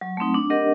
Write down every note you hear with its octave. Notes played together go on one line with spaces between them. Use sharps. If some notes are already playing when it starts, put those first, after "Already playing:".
F#3
A3 C4 D#4
D4
G4 A#4 D#5 F#5